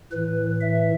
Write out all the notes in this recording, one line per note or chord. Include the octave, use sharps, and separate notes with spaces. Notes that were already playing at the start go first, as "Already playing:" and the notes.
A2 E3 B4
E5